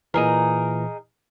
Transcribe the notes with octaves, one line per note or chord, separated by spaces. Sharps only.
A#2 E3 D#4 G#4 A#4